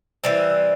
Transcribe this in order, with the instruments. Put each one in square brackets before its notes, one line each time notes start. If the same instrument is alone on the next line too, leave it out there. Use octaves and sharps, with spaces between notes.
[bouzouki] E3 G3 C4